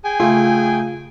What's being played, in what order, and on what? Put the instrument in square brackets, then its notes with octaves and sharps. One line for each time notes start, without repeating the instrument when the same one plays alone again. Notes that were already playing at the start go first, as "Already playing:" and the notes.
[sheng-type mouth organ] G#4 G5 [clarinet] G#5
[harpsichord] C#3 A3 [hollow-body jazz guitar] F4